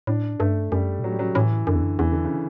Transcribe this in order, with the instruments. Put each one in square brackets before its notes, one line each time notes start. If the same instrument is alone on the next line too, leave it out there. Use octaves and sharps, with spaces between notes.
[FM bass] A2 [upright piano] D4
[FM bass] G2 [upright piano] A3
[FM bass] F#2 [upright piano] G3
[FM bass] B2
[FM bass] A2 [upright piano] F#3
[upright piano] G3
F#3
[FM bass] A2 [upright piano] E3
[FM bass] F#2 [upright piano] D3
[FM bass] E2
F#2
[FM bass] E2 [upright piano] E3
[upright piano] D3
C#3